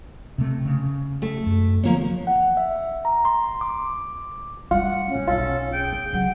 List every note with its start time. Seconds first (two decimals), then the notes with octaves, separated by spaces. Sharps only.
0.38 C3 A3
0.65 C#3
1.22 A3
1.46 F#2
1.83 D3 F3 A#3 B3 C#5
2.27 F#5
2.57 E5
3.05 A#5
3.25 C6
3.61 D6
4.71 G3 A3 F4 F#5
5.08 C#4
5.28 B1 F4 A4
5.73 G#4 G5
6.13 C#3 F#3 F#5